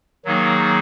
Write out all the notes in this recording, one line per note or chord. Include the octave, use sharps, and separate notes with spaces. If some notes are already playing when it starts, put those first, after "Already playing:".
D#3 F#3 A#3 D#4 G#4